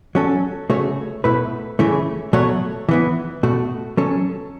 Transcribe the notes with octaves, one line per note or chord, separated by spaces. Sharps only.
F#3 C#4 A4
C#3 A3 F#4 C#5
B2 A3 E4 B4
C#3 E3 A3 C#4 E4
B2 F#3 A3 F#4 C#5
E3 B3 E4
B2 A3 F#4
F#3 C#4 A4 C#5